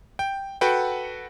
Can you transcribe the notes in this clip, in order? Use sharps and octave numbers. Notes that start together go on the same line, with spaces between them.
G5
F#4 A4 B4 F#5 G5